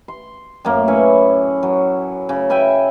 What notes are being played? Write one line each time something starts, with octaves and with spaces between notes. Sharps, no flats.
C6
F#2 A2 A#3
C#4 E4 B4 C#5
F#3
C#3
E5 G5 G#5 B5